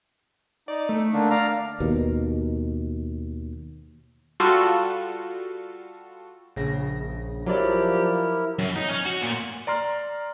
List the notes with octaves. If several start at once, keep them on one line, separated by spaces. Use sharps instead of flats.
D#4 D5
A3
D3 A#3 D4
D5 F5 A#5
D#2 B2
G3 F4 F#4 A4
A#1 C#3 A#6
F3 F#3 E4 G4 A#4 D5
F#2
D#4
C#4
F#4
A#2
D5 A#5 C6 F6